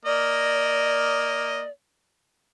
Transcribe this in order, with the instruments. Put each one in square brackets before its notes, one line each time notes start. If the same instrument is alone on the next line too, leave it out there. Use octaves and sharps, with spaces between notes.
[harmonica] A#3 D#5 [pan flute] D5